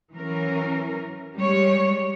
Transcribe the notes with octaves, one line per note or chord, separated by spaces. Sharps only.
E3 F#3 C#4 A#4
G3 G#3 G4 C#5